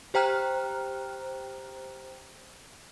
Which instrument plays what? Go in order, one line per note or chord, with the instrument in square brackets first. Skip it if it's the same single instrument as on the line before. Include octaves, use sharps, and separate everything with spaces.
[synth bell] G4 C5 G5 A#5 F6 F#6